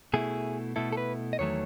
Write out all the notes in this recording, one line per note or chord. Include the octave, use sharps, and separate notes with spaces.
B2 A3 E4 G#4
B2 A3 E4 A4
A4
B4
D#5
E2 D#3 F#3 A3 C#5